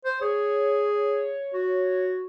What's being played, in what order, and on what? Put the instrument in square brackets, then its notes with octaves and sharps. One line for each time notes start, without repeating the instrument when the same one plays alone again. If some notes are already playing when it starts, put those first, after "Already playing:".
[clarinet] C5
[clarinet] G#4 [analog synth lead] C#5
[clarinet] F#4